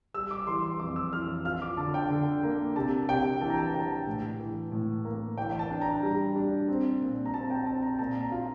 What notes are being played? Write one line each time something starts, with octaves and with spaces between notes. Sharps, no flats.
G3 E6
D6
E3 C6
C6
F2 D6
E6
E3 F6
F4 F6
D6
D3 A5
G5
D3
A#3
C3 A5
C3 G5
E3 A5
A#5
A5
E3 G5
A5
A2
E3
A2
A#3
E3 G5
G5
A5
D4
A#5
G3
D4
C4
A#2
A#5
C4 A5
G5
C4 A5
A#5
A#2 A5
A#5
F4